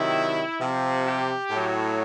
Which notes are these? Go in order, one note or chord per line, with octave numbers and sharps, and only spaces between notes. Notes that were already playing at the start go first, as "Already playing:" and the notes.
Already playing: C3 D#3 F#3 E4
C3 F3
G4
A2
F#3